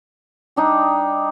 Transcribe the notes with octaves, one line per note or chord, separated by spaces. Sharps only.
G3 D4 D#4